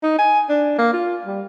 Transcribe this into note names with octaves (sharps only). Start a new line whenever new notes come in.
D#4
G#5
D4
A#3
F4
G3